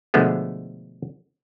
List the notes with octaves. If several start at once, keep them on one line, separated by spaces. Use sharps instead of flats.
B2 D3 F3 G#3 A3 B3